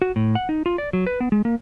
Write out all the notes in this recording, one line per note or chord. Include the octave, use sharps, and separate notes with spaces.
F#4
A2
F#5
D#4
F4
D5
F#3
B4
B3
G#3
A#3